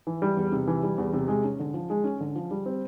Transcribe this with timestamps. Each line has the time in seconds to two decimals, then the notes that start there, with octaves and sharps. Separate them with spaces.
0.07 E3
0.22 G3
0.37 E2
0.52 C3
0.68 E3
0.83 G3
0.98 E2
1.13 C3
1.28 G#3
1.44 C#4
1.59 D3
1.74 F3
1.90 G#3
2.04 C#4
2.20 D3
2.36 F3
2.51 G3
2.66 C4